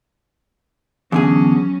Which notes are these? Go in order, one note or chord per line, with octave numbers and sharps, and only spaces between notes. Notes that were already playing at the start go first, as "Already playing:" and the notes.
E2 D3 F#3 C#4 G#4